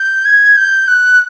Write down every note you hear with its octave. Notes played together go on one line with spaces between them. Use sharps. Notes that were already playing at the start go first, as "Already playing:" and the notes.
Already playing: G6
G#6
G6
F#6